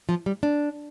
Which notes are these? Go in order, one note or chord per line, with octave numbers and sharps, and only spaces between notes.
F3
G3
D4